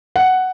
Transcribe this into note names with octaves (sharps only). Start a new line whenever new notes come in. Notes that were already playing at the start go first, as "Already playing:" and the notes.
F#5